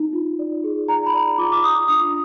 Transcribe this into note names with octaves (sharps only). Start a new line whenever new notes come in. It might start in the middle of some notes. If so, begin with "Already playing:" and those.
Already playing: D#4
F4
D5
G#4
D5 A#5
B5
D5 A#5
F4 D6
D6
F4 D#6
D4 D#6